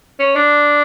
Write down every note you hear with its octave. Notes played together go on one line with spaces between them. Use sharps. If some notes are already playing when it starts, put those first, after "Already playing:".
C#4
D4